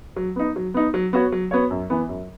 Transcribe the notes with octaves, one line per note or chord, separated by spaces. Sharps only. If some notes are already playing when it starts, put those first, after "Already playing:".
F#3
B3 D#4
F#3
B3 D#4
F#3
B3 F#4 C#5
F#3
B3 F#4 C#5
F#2
E3 B3
F#2